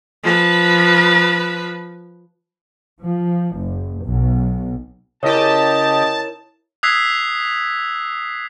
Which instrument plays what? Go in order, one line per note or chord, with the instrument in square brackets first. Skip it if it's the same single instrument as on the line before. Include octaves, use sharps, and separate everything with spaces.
[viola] F3 B4
[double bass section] F3
F#1
B1
[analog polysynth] C#3 G4 [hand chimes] E4 A#4 C#5 [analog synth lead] D#5 [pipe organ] A5
[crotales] D#6 E6 F#6 G#6 B6 C7